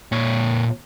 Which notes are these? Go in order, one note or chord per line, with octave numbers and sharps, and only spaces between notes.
A#2 C#5